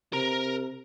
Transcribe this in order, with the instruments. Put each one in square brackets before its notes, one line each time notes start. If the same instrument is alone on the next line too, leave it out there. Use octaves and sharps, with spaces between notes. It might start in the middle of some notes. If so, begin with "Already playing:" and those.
[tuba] C3 [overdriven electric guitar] A#4 A#5